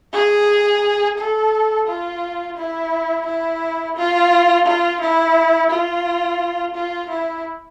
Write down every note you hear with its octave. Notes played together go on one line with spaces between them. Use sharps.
G#4
A4
F4
E4
E4
F4
F4
E4
F4
F4
E4